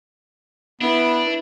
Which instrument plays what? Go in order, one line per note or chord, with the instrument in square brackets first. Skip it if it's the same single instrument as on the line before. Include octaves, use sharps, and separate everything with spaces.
[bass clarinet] B3 [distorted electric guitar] D4 [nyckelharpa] E4 B4